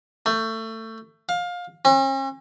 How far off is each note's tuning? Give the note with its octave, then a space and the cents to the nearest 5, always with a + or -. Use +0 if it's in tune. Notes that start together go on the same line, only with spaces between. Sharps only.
A3 +25
F5 +20
C#4 -45